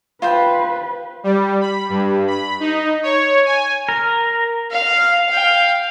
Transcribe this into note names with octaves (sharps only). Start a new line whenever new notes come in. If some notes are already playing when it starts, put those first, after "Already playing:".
F4 B4 C5 G5
G3
B5
G2
B5
D#4
C#5
G#5
A#4
F5
F5 G5